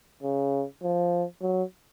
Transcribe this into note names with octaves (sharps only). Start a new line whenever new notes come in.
C#3
F3
F#3